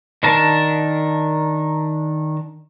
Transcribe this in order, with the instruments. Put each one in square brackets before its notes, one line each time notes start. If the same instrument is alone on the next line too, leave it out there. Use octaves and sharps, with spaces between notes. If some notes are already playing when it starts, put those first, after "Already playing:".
[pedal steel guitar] D#3 D4 A#4 A5